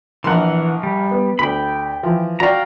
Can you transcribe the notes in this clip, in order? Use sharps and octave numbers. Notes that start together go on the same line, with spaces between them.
A#1 E3 A#4 F#5 C6
G3
B3
D2 G5 B5
E3 F3
F#4 D5 F5 G5 A#5